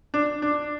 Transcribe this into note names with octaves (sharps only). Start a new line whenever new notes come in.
D4
D4